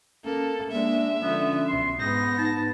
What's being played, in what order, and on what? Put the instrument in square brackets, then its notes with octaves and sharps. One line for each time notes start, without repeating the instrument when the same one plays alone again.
[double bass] A#3 [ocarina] C#4 [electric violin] A4
[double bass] G#3 D4 [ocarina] A#3 [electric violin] E5
[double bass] D3 F3 [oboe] B3 [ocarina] C#4
[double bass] B1 [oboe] C6
[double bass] G#2 B3 [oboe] D#4 [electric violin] A#6
[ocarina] D#4 [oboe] A5